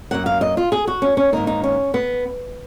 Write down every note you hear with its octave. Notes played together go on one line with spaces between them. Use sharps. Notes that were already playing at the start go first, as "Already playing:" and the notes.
F#2 D#3 A#3 F#5
F5
D#5
F4
G#4
F#4
C#4
C#4
G#2 D#3 A#3 D#4
D#4
C#4
B3